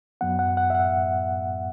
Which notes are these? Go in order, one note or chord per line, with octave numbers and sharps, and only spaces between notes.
F#2 F#3 B3 F#5
F#5
F#5
E5
F#5